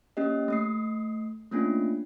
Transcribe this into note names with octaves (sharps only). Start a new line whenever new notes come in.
A#3 C#4 G4 D#5
A3 D#6 C7
A3 A#3 C#4 D4 F4